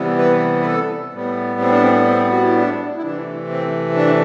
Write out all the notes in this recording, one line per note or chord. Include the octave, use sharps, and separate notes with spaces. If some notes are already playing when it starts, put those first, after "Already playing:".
Already playing: C3 E3 G3 B3
B4
B4
A4
A2 G3 B3
C4
D4
C4
C4
F#4
E4
D4
E4
C3 E3 A3 D4
C4
D4